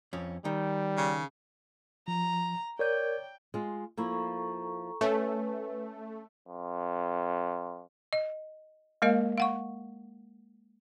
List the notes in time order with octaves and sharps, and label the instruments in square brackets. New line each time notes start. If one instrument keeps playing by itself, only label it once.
[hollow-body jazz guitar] F2 C#4
[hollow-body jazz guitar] D#3 [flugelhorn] G3
[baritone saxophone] C#3
[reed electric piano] F3 [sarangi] A#5
[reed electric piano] A#4 [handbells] C#5 D5 G6 [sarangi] G5
[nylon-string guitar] G#3 F4
[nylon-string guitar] F3 A#3 E4 [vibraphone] A4 A#5 C#6
[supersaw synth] A3 [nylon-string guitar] C#4 [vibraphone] B4
[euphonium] F2
[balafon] D#5
G#3 A#3 A#4 D#5 F5
F5 F#5 C#6